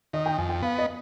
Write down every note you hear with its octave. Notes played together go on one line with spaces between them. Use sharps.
D#3 D#5
G5
F2 G#5
G5
B3 F5
D#5